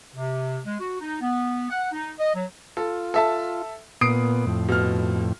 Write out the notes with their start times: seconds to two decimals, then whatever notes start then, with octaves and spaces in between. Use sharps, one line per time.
0.15 C3
0.66 G#3
0.80 F#4
1.00 D#4
1.21 B3
1.70 F#5
1.92 D#4
2.18 D#5
2.34 F#3
2.77 F4 A4
3.14 A4 E5 A5
4.01 A#2 B3 D#6 C7 D7
4.47 F2 A2
4.69 B2 F6